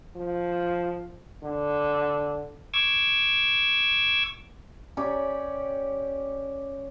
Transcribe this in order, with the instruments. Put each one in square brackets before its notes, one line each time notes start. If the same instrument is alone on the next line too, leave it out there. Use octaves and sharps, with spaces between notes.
[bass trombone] F3
D3
[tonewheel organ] C#6 D6 E6 G#6
[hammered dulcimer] C#4 G4 C#5 D5